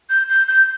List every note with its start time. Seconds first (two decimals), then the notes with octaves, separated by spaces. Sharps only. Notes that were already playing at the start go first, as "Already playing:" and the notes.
0.10 G6
0.29 G6
0.48 G6